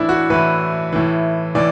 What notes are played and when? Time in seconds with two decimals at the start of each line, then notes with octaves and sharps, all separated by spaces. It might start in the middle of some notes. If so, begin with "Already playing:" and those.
Already playing: A2 E3 D4 E4
0.09 F#4
0.30 A2 E3 B4
0.93 A2 E3
1.55 A2 E3 D5